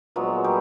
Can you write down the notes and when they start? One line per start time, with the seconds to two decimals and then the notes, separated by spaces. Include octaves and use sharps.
0.16 A#2 F3 F#3 G#3 B3 F#4
0.44 G3 G4